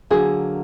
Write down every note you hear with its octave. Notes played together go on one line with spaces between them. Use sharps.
D3 F#3 A#3 G#4